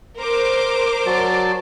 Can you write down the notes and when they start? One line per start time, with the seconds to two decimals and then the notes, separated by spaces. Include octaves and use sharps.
0.20 A#4 C5 D6
1.06 F#3 D5 A5